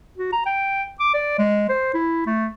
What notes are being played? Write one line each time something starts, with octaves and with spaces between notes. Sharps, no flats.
F#4
A#5
G5
D6
D5
G#3
C5
E4
A3